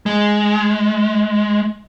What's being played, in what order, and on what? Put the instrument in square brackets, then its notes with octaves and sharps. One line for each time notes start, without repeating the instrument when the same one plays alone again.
[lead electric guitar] G#3